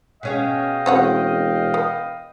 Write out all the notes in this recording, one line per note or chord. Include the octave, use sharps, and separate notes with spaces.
B2 C#4 G#4 D#5 F5 G5
E1 C4 C#5 F#5
B3